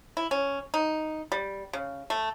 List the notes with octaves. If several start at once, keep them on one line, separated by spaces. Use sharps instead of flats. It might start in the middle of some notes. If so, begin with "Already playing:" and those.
E4
C#4
D#4
G3
C#3
A3